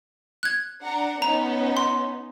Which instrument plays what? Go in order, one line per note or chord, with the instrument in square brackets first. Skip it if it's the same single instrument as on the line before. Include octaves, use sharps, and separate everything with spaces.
[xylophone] F#6 G#6
[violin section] D4 F#5 A#5
[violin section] B3 C#4 D#4 [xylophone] A#5
[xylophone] C6